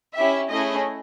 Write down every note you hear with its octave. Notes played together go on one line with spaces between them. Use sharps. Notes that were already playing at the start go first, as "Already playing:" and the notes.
C#4 E4 G4 E5
A3 C#4 E4 G#4 D#5